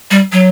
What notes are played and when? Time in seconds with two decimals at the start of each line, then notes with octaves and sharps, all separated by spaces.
0.11 G3
0.32 F#3